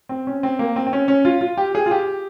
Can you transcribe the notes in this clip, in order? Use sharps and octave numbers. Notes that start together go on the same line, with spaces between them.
C4
C#4
C4
A#3
C4
C4
C#4
C#4
F4
F4
G4
G#4
F4
G4